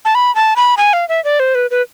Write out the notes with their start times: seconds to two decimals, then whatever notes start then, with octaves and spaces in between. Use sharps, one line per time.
0.05 A5
0.15 B5
0.35 A5
0.56 B5
0.77 G#5
0.93 F5
1.09 E5
1.24 D5
1.40 C5
1.55 B4
1.71 B4